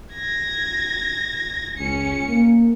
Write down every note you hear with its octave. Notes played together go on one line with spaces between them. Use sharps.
G#6 A#6
C#2 C#4 C#7
A#3